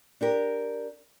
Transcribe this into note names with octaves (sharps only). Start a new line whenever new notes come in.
D4 G4 A#4